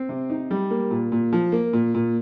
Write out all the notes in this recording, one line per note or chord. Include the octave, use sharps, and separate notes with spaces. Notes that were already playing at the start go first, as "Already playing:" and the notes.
Already playing: C4
C3
D#4
G3
A#3
A#2
A#2
F3
A#3
A#2
A#2